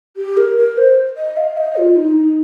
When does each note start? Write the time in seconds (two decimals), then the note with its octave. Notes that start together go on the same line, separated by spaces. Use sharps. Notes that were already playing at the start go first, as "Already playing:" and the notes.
0.17 G4
0.37 A#4
0.57 A#4
0.78 C5
1.17 D#5
1.37 F5
1.57 D#5
1.77 F4
1.96 D#4
2.16 D#4